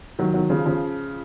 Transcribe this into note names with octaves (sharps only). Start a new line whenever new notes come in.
D#3 F#3
D#3 F#3
C#3 F3
C#3 F3